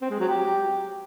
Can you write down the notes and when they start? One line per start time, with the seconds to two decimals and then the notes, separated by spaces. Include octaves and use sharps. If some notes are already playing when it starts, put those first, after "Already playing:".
0.02 C4
0.11 G#3
0.20 F#3
0.29 G4